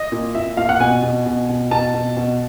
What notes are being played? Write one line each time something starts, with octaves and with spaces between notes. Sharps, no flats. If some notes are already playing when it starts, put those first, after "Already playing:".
Already playing: D#5
A#2
A#2 E5
A#2 F5
F#5
B2 G#5
B2
B2
B2
B2 A5
B2
B2